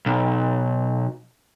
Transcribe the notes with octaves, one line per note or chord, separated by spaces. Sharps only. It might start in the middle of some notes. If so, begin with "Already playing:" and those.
B1